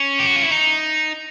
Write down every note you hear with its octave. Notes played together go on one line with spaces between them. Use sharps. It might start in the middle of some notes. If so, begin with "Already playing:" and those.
Already playing: C#4
G4
F#4
F4
E4
D#4